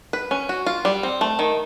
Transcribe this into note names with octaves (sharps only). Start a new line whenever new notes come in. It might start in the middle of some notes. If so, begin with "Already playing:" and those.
B4
C#4
F#4
F4
G3
C4
A3
D#3